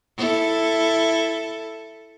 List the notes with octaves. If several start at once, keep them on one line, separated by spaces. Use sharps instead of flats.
E4 A4